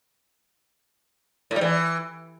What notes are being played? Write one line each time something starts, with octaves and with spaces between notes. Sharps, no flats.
A2
G3
E3